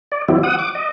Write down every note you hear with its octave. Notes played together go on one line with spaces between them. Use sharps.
D5
E3 F#3 G3 C4 E4
F#5 D#6
D6
D#5